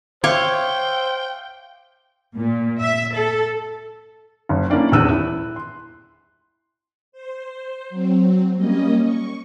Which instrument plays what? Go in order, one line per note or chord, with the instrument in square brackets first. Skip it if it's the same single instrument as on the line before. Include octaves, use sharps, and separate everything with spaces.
[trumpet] C5 [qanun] C#5 [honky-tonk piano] E5 F5 D6 [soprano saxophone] G5
[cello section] A#2
E5
A4
[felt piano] F#1
A#3 C#4 D4 E4 D5 F5
D#1 E2 D4 E6 F#6 D#7
E4
C6
[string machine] C5
F#3 C4
G3 A#3 C#4 D#5
C#6